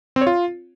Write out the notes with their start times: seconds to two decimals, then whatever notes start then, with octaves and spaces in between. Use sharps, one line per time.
0.16 C4
0.21 C#5
0.27 F4